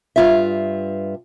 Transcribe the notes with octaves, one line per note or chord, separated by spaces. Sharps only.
G2 F4 E5